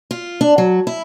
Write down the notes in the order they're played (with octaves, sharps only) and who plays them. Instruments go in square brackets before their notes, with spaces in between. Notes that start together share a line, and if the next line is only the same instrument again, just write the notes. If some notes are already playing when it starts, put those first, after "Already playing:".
[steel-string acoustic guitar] F4
D4
F#3
E4